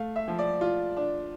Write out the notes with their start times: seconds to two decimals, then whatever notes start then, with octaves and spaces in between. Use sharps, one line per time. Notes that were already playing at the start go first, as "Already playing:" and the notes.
Already playing: A3 F5
0.16 E5
0.28 F3
0.39 D5
0.61 F4
0.97 D4